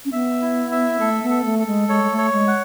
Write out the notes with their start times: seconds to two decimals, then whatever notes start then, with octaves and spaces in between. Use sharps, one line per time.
0.05 C#4
0.12 B3 E5
0.42 E4
0.71 E5
1.00 A3 A4
1.23 B3
1.30 A4
1.45 A3
1.59 A4
1.67 G#3
1.89 G#3 C#5
2.03 G#3
2.11 A3
2.18 C#5
2.32 G#3
2.48 F#5